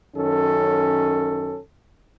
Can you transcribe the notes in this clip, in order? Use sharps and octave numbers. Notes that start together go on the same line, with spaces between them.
F#2 D#3 C#4 A4